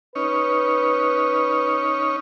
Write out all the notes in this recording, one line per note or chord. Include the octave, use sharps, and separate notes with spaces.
C#4 D#4 B4 C#5